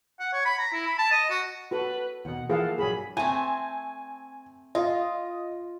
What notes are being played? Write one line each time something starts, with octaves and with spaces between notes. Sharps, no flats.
F#5
C#5
B5
A#5
E4
B5
A5
D#5
F#4
F#4 A4 B4
D#2 B2 F#5
E3 F3 A#3 G#4 A4 F5 F#5
A#1 G2 F#3 G#4 G#5 B5
A3 C4 G#5
F4 D#5